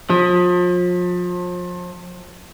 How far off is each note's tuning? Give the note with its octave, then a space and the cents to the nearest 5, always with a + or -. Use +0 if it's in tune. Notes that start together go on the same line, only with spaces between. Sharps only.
F3 +35